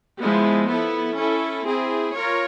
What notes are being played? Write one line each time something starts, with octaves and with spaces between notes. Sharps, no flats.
F3 G#3 B3 E4
B3 E4 A4
C#4 E4 A4
C4 E4 G#4
F4 A#4 C#5